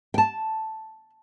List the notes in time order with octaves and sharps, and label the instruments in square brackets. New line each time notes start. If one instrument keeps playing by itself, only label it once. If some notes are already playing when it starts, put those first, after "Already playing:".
[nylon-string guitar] G5 A5